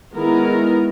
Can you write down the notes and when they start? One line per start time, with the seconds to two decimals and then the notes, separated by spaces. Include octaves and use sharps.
0.13 D#3 G#3 B3 E4 A#4